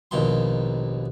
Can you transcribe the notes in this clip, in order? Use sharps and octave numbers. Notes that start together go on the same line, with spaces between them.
A#1 D#2 B2 C6